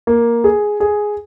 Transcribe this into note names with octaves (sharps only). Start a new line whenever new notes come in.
A#3
G#4
G#4